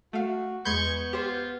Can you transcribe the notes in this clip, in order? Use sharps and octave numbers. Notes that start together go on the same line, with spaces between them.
A3 F#4 F5
E2 G#3 B3 B5 C#6 G6 G#6
F4 G4 C5